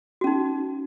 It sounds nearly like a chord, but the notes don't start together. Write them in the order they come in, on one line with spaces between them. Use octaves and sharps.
F#4 C#4 D#4